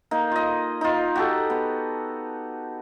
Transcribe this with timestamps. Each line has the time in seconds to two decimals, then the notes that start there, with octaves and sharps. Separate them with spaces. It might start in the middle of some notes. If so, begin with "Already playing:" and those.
0.11 A#3 D#4
0.31 F4 D#5
0.81 D#4 F4
1.16 F#4 G4 A4
1.50 B3